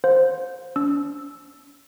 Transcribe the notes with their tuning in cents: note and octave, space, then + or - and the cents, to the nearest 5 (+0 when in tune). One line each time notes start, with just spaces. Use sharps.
C5 +0 F5 +40
D4 -45 E6 +0